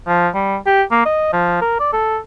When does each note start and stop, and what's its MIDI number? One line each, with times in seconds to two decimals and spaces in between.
0.07 0.28 53
0.34 0.56 55
0.66 0.83 67
0.91 1.03 58
1.05 1.30 75
1.33 1.57 53
1.61 1.75 70
1.79 1.89 74
1.93 2.18 69